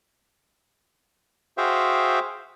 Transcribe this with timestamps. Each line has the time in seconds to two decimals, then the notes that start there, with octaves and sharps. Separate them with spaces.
1.58 F#4 G#4 C5 E5 F5 G5